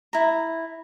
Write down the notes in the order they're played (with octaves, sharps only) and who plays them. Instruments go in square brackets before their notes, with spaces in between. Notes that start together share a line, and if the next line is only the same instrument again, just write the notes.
[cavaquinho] E4 A#5